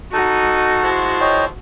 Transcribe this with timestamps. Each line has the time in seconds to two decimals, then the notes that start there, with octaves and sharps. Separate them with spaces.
0.13 D#4 F#4 A4 A5
0.82 F3 G#3 E4
1.20 C#5 D#5 G5